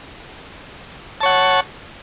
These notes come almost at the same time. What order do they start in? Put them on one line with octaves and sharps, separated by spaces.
A5 C#5 F#5